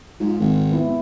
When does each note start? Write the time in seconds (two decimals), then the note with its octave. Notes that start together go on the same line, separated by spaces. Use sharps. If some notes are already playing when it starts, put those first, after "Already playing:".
0.20 G#2 F4
0.40 G#1
0.71 B3 E4